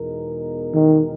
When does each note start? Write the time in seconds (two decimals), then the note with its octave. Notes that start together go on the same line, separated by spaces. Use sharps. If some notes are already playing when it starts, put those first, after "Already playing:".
Already playing: E2 B2 G#3 D#4 A#4
0.74 D#3